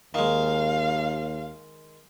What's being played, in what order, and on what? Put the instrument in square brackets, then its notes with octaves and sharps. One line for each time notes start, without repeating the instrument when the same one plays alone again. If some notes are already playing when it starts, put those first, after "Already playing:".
[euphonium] D#2 [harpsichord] D#3 G#3 [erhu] F5